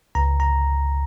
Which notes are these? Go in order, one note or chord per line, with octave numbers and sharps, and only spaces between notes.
C#2 A#5
A#5